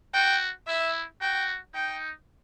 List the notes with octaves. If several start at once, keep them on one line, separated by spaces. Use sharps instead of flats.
F#4 G5
E4 E5
F#4 G5
D#4 G5